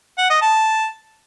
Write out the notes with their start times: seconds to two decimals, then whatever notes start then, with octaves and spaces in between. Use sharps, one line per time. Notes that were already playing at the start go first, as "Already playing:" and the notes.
0.18 F#5
0.30 D#5
0.42 A5